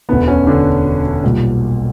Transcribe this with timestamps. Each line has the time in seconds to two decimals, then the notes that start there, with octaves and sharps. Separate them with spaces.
0.09 E1 D2 D3 B3
0.28 C#4
0.47 D3 D4
1.24 B1 A#2 G3